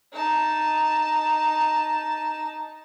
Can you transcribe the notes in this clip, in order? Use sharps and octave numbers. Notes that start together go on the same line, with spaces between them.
D#4 A5